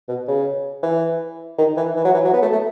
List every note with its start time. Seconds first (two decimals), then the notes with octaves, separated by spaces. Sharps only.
0.09 B2
0.28 C#3
0.83 E3
1.58 D#3
1.77 E3
1.96 E3
2.05 F#3
2.14 E3
2.24 F#3
2.33 B3
2.42 A3
2.52 A3